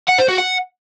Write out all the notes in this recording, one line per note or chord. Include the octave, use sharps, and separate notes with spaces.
F#5
C5
F#4
F#5